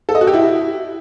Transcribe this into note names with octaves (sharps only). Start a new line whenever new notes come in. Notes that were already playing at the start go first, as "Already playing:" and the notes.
A4
D#5
F#4
G4
E4